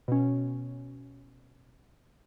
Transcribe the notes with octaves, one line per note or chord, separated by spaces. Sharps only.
B2 C#4